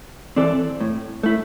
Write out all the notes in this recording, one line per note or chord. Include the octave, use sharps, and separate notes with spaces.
E3 C4 A4 D5
A2
A3 E4